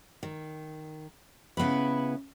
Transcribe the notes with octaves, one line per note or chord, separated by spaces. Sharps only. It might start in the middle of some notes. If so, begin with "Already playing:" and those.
D#3
C#3 B3 E4 B4